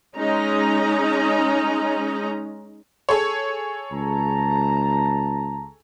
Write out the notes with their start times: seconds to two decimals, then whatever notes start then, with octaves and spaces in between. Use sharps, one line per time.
0.17 G#3 C#4 D#4 D#5 A#5
3.09 G#4 A4 C#5
3.91 C#2 A5 A#5